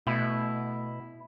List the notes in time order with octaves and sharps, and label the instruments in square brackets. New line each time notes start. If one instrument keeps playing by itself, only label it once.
[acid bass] B2 [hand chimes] A3 [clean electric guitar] E4